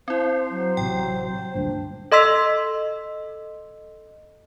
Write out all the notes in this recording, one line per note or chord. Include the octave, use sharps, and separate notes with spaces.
C4 E4 C5
F#3
A1 C3 G5
D2 G2 A#2 D4
A4 D#5 C6 E6 B6